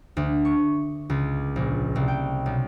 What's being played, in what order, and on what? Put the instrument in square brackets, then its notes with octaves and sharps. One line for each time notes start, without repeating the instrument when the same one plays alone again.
[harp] D2
C#6
C#2
A#1
C2
G5
B1